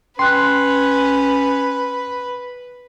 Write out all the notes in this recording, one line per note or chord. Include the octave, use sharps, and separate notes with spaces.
C#4 B4 G5 C6 F#6